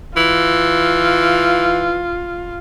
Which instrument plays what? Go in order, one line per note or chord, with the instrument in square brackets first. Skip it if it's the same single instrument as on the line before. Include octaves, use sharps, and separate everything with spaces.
[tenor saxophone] E3 [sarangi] F4